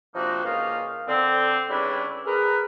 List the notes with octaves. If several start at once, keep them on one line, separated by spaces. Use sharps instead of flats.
C3 F3 A#3 D4 D#4 F#4
C#2 A#3 C#4 D#4 F4 F5
D3 C4
C#3 G3 C#4 D4 E4 B4
G#4 A#4 B4